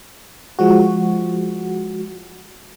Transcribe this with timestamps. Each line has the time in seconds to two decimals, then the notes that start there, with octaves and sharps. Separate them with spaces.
0.59 F3 G#3 F#4